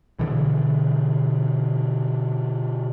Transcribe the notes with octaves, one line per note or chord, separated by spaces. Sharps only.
B2 D3 E3